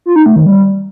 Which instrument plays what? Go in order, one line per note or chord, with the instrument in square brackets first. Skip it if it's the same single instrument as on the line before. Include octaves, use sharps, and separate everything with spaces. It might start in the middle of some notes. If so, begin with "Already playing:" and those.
[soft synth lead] F4
D#4
A3
D#3
G3